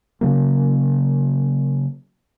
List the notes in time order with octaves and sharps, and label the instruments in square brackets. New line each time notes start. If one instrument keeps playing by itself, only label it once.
[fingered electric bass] C#3 F#3 A#3